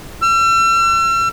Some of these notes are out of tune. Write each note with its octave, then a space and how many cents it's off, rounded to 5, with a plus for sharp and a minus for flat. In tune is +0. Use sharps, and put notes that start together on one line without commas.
E6 +40